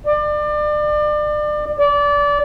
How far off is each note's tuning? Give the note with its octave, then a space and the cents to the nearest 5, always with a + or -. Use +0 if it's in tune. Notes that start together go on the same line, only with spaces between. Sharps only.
D5 +30
D5 -25